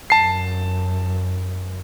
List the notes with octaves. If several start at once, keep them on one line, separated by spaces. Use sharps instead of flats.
F#2 A5 C7